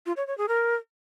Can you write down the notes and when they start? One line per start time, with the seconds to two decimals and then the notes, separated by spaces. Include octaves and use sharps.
0.06 F4
0.17 C#5
0.27 C#5
0.38 G#4
0.48 A#4